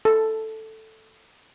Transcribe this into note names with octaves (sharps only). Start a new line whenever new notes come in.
A4